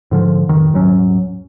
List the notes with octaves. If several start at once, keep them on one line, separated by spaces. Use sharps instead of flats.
G#2 D3 F3
A1 F2 B2 D#3
D#1 G#2 F#3 C#4